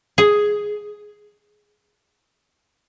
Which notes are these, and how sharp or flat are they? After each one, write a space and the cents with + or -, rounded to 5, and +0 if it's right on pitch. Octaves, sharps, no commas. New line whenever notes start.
G#4 +5